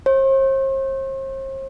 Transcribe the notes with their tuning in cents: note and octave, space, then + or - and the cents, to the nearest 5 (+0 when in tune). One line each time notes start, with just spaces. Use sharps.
C5 +45